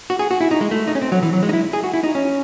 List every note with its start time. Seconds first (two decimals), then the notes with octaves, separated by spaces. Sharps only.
0.10 F#4
0.19 G#4
0.31 F#4
0.41 E4
0.51 D#4
0.61 G#3
0.71 A3
0.88 D#4
0.95 C#4
1.02 C4
1.12 F#3
1.23 E3
1.33 F#3
1.43 G#3
1.49 D#4
1.53 E4
1.73 G#4
1.84 F#4
1.94 E4
2.03 D#4
2.15 C#4